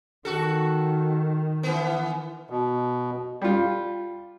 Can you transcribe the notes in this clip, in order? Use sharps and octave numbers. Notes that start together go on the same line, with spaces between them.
D#3 F#4 A4
E3 B3
B2
G3 F4